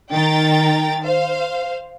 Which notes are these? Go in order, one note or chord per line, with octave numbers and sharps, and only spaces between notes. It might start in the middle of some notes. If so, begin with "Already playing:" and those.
D#3 G5 A#5 A6
C5 F5